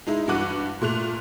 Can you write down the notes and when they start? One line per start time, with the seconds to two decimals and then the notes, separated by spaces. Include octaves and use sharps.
0.07 G#3 D#4 E4
0.28 G2 E3 F#4 D6 F#6 D#7
0.81 A#2 A3 F#6 F7